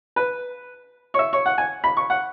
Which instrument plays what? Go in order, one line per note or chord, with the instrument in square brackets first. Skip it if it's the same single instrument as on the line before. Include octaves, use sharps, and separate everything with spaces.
[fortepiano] B4
C#5
E5
C#5
F#5
G#5
B5
C#6
F#5